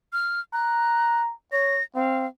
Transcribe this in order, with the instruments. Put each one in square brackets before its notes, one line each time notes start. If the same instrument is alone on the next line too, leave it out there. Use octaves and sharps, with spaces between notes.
[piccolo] F6
[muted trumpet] A#5 [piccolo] F#6
[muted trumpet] C#5 [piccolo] A#6
[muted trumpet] C4 [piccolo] F5